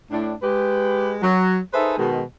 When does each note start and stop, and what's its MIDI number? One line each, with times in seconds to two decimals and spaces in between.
0.11 0.34 45
0.11 0.34 62
0.42 1.17 56
0.42 1.17 67
0.42 1.17 71
1.22 1.57 54
1.73 1.95 63
1.73 1.95 68
1.73 1.95 69
1.73 1.95 71
1.73 1.95 72
1.73 1.95 76
1.97 2.22 47
1.97 2.22 51
1.97 2.22 56